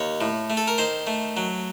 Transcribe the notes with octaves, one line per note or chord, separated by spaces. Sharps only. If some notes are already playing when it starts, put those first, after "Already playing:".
Already playing: D#2 C#5
A2
A3
A4
A#4
D#3 C5
A3
F#3